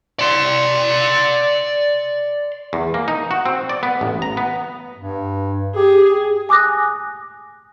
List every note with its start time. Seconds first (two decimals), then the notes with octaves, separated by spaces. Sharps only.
0.19 D5 C6
2.73 E2
2.94 A#3
3.08 D#4
3.31 F#4
3.46 C4
3.69 D5
3.83 B3
4.01 A1
4.22 A#5
4.37 B3
4.96 G2
5.76 G4 G#4
6.49 G#5 D6 D#6 F#6 A#6